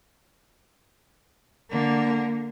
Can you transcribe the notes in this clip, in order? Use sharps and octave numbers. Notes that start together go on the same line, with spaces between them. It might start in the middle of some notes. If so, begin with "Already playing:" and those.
D3 A#3